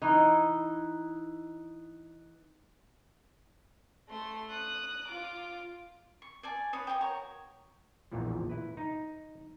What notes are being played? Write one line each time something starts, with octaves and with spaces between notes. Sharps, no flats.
E3 D#4
A3 C6
D#6 F#6
F4 D6
C#6
D5 G#5 A5
B4 C#5 D#6
G5 G#5 C#6 D#6
F#4 A#4 C#5 C#6
A#1 E2 A#2 E3 F3
E4 B4
D#4